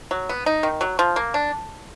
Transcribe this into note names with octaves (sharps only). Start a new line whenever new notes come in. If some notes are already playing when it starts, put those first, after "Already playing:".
F#3
B3
D#4
D#3
F#3
F3
A#3
D4